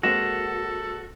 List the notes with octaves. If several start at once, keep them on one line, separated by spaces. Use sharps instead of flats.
G#3 A#3 C4 F#4 A4 A#6 E7